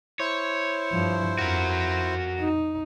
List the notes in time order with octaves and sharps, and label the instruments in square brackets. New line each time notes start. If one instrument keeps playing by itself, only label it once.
[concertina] E4 C5 [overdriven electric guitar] C#5
[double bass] G2 F3
[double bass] F2 [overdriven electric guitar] F#4 A#4
[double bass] D#4